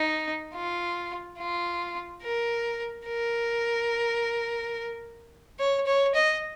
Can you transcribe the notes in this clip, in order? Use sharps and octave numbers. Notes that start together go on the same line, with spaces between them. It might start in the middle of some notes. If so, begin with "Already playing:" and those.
Already playing: D#4
F4
F4
A#4
A#4
C#5
C#5
D#5